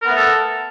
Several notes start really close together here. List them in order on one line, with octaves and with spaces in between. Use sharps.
A#4 B3 A3 A4